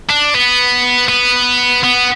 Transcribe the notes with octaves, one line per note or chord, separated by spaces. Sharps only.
D4
B3
B3
B3